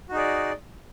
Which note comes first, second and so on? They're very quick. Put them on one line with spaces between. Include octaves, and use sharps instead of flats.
F#4 D#4 G#4 D5